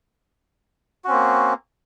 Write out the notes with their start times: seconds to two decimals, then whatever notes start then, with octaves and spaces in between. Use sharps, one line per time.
1.05 F#4
1.07 C#4
1.10 C4
1.13 A#3